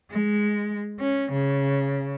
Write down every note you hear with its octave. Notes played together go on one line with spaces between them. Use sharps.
G#3
C#4
C#3